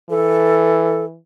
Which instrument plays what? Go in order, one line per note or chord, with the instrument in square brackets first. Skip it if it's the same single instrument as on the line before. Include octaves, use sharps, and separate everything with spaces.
[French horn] E3 [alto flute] A4